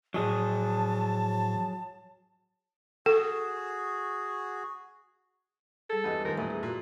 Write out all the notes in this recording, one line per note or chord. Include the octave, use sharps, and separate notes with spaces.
A2 F3 F#3 G#4 A5
F#4 G#4 A4
G3 G#4 A4
E2 G2 G4 D#5 F#5
G#2 D#3 F3 A#4
E2 G2 A#2 A3 A#5
G#4
A#2 F#4